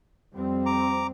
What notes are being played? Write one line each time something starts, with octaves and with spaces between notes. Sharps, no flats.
F2 G3 C4
A#5 D6